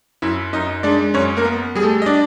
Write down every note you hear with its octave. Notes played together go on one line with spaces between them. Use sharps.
F#2 E4 E5
F#2 D#4 D#5
G#3 D4 D5
F#2 C#4 C#5
A#3 A#4
B3
G3 G#4
A3 A4
D#5
D4 D5